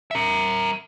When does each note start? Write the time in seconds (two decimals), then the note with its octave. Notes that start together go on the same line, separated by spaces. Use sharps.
0.11 A#4 E5